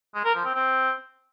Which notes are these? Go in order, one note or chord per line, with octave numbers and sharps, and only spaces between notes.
G#3
A#4
F3
C4
C4